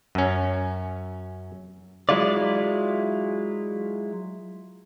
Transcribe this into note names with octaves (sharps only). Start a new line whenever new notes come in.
F#2 C#4
F#3 G#3 E4 F4 D5